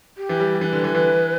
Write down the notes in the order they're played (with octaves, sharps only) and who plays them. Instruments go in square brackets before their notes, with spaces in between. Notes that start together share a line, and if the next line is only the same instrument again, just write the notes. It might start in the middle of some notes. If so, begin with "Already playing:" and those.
[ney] G4
[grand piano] E3
G3
[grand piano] E3 [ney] B4
[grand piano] D3
E3
E3